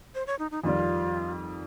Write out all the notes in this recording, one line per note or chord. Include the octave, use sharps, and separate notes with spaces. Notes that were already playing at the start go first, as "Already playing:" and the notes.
C5
C#5
D#4
D#4
F2 D#3 G3 F4